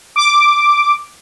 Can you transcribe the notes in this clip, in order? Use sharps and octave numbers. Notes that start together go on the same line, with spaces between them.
D6